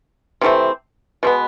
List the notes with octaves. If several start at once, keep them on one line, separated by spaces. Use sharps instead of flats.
C3 E3 A3 C4
B2 G#3 B3